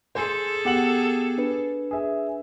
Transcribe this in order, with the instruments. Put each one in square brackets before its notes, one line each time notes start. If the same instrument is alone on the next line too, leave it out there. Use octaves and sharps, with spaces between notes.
[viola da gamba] G#4 A4 [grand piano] C5 G#5 C6
[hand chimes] B3 [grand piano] G4 F#5 F#7
[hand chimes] D4 B4
[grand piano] G#4 E5